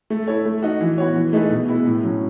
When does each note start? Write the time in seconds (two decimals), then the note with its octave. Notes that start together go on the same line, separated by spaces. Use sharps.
0.10 A3
0.27 E4 A4 C#5
0.46 A3
0.63 D#4 F#4
0.81 E3
0.98 B3 F#4 C#5
1.16 E3
1.33 A3 D#4 G#4 B4
1.50 B2
1.68 G#3 B3 E4
1.86 A2
2.03 F#3 C#4